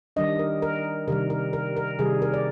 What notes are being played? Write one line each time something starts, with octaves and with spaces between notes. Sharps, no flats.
D#3 G3 D4 D#5
A#4
A#4
C3 D#3 G3 A#4
A#4
A#4
A#4
C3 D#3 G3 G#4
A#4
D5